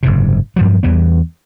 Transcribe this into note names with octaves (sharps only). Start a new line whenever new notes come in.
F#1 G#2 C3
G2 F3 F#3
E2 E3 G3 B3